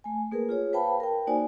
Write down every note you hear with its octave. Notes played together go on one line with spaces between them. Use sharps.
A3 G#5
A#3 G#4 A#4 B4
F4 G#4 C#5
B4 C5 F5 G5 A5 B5
A#4 G5
A#3 D#4 F#4 C5 D5 G#5